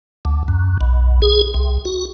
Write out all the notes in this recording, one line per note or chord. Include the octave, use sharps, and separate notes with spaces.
D2
F#2
B1
G#4
C2
F#4